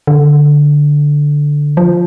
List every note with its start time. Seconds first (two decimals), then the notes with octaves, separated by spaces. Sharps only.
0.07 D3
1.77 F3